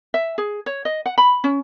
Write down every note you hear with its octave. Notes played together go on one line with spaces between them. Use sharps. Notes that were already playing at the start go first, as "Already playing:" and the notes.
E5
G#4
C#5
D#5
F#5
B5
C#4